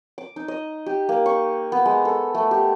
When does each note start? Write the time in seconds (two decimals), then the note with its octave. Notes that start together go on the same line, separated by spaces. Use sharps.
0.18 D6
0.36 D#4
0.48 D#5
0.86 G4
1.09 A#3
1.26 C#6
1.72 B3
1.86 G#3
2.05 A4
2.35 A3
2.51 G4